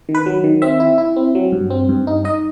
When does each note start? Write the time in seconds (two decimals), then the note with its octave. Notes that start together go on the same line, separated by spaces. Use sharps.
0.09 D#3
0.15 B4
0.26 F#3
0.44 D#3
0.62 C4 E5
0.80 E4
0.98 E4
1.16 C4
1.35 F#3
1.52 G2
1.70 C4
1.89 G2
2.07 D#4
2.24 D#4 D#5